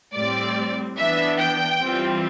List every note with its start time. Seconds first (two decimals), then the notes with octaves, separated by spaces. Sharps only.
0.14 A2 G3 C4 D5
0.98 E3 B3 D4 E5
1.39 G5
1.81 E3 G3 C4 F4